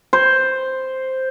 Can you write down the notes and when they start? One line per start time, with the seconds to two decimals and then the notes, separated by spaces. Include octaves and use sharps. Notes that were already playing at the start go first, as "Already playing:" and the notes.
0.13 C5